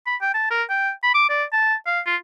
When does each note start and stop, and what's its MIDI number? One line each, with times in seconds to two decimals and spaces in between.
0.06 0.15 83
0.21 0.32 79
0.34 0.50 81
0.51 0.63 70
0.70 0.91 79
1.03 1.13 83
1.14 1.27 86
1.29 1.43 74
1.53 1.74 81
1.86 2.00 77
2.06 2.16 65